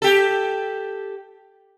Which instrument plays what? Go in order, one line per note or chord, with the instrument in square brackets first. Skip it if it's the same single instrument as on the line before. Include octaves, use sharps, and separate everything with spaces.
[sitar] G4 A4